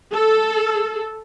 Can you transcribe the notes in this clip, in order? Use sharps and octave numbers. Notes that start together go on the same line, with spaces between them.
A4